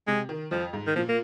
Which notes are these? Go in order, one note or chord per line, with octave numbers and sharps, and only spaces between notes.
C3 G#3
D#3
F2 F3
G#2
D#3
A#2 F3
A#3